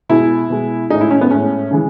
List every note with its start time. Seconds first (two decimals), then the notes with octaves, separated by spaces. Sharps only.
0.09 B2 G#3 E4
0.50 B2 G#3
0.90 A2 G#3 D#4
1.01 E4
1.11 C#4
1.21 B3
1.31 A2 G#3 C#4
1.71 C#3 E3 G#3